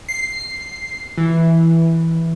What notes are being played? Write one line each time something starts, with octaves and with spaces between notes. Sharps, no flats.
C7
E3